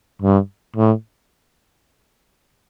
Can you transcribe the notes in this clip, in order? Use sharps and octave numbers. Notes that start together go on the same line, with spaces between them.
G2
A2